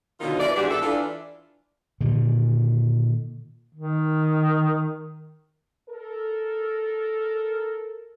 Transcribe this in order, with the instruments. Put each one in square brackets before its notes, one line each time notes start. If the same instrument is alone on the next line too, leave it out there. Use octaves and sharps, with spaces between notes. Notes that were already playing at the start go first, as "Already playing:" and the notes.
[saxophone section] B2 D3 D#3 F#3 D#4 F4
E3 D5
E2 G#2 D4 F#4 G4
A4
E3 D4 F4
[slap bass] A#2 D3 D#3
[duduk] D#3
[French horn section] A4 A#4